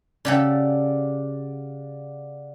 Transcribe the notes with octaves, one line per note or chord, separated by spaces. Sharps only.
C#3 G4 A4 D5 F5 F#5